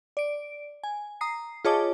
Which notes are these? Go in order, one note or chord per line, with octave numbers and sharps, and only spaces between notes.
D5 D7
G#5
A#5 D#6 C7
F4 G#4 C#5 D#5 A5 D6